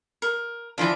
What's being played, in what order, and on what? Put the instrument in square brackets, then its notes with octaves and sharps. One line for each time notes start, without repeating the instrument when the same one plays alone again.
[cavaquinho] A#4
[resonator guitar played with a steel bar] E3 F3 D4 [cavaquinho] F4 D5